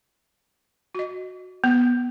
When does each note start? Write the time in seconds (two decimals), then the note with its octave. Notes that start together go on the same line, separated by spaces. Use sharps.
0.95 F#4 D#5
1.64 B3